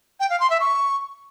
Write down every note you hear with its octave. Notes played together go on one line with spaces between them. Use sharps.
G5
F5
C6
E5
C#6